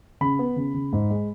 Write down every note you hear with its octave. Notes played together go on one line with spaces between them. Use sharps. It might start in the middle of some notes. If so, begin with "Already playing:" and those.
C#3 B5
B3
C#3
C#3
G#2
G#3